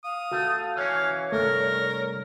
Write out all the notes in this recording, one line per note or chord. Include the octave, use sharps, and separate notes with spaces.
F5 D#6
A3 F#4
E3 C#4 C#5 F5
C2 G2 A3 A#4